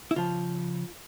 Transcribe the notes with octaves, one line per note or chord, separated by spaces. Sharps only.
E4
C#3 F3 F4